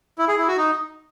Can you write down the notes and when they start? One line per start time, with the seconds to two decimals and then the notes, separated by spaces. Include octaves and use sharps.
0.18 E4
0.28 G#4
0.38 E4
0.48 F#4
0.58 D#4